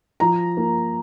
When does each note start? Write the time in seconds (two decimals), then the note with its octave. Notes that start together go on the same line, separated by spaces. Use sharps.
0.20 F3 A#5
0.57 A#3